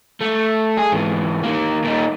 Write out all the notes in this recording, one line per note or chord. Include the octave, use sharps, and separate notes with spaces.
A3
G#4
G#2 E3
D#3 A#3
A#2 D#4